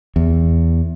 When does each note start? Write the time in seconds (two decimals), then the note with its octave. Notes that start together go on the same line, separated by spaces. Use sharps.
0.16 E2